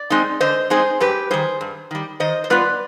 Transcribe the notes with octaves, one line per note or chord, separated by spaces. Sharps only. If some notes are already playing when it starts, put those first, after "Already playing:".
Already playing: D5
G#3 C4 D#4
D3 C5 D#5
G#3 C4 D#4 G#4 C5
G2 G4 B4
D#3 G3 G#4 C5
G2
D#3 G3
D#3 C5 D#5
C5
G3 B3 F4 B4 D5